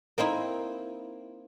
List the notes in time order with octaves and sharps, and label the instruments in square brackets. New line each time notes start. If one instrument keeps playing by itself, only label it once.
[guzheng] A#3 C4 D#4 E4